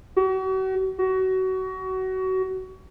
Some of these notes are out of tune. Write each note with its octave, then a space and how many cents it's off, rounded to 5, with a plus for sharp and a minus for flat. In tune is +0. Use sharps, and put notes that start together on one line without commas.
F#4 +40
F#4 +25